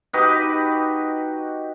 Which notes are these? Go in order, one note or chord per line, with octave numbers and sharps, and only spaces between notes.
D#4 F#4 G4 B4